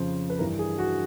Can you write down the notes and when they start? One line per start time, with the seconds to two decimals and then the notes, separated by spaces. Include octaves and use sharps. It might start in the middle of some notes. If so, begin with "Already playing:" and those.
Already playing: F2 C#3 F3 C5
0.30 B4
0.39 G2 E3 G3 A#4
0.59 G#4
0.78 F#4